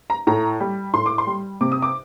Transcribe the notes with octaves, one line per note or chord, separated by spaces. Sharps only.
A#5
A2 A#5
G3
A2 C6
D6
C6
G3
C3 D6
D#6
D6